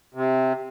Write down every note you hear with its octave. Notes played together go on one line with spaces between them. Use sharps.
C3